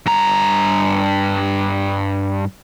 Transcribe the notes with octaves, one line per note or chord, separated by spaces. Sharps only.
G2 A#5